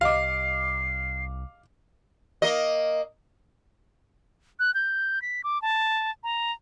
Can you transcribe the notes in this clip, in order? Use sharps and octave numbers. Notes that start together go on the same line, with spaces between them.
C2 G4 D#5 F5 D6 C7
A#3 D#5
F#6
G6
B6
D6
A5
A#5